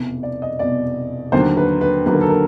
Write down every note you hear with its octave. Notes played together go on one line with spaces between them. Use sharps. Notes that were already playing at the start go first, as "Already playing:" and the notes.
Already playing: F1 E2 B2
D5
D#5
F1 E2 B2 D5
D#2 D3 F#3 A#3 C5
B4
B4
D#2 D3 F#3 A#3 B4
A#4
A4
A#4